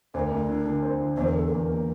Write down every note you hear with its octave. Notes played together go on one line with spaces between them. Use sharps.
D2 C5
A#4
D2
D3
D3
C4
D3
E2 C5
A#4
E2 A4
E2 A#4
A#3